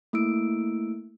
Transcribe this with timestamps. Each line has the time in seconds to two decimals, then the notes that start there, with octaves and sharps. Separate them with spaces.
0.13 A3 A#3 E4 E6 D7